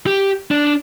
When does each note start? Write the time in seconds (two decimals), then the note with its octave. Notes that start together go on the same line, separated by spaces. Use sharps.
0.07 G4
0.51 D4